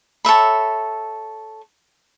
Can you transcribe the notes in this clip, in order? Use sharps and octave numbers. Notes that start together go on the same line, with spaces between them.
A4 C#5 E5 B5